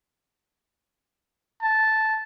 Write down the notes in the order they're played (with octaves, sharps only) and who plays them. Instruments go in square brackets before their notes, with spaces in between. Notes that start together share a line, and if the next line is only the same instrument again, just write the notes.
[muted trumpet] A5